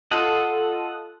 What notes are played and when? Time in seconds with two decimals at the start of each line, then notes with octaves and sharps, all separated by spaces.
0.11 F4 A4 D#5 F#5